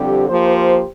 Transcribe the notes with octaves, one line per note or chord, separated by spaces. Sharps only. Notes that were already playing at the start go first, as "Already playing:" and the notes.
Already playing: F2 D3 G3 C4 G4
F3 A#3 G4 C5